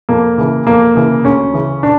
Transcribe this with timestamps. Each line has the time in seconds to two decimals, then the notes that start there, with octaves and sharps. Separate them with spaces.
0.09 F2 A#3
0.38 C#3 E3
0.67 F2 A#3
0.95 C#3 E3
1.25 D2 C#4
1.54 C#3 E3
1.83 D4